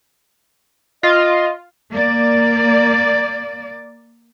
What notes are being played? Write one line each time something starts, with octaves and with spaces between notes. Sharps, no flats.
F4 D#5
A#3 D5